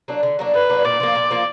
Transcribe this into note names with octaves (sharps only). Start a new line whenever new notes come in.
F#3 A#3 D4
D3
F#3 A#3 D4
D3 B4
F#3 A#3 D4
A#2 D5
F3 A#3
A#2
F3 A#3